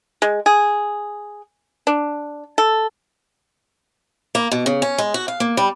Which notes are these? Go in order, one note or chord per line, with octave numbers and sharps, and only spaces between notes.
G#3
G#4
D4
A4
A#3
B2
C#3
C#4
G#3
F#4
F5
A#3
G3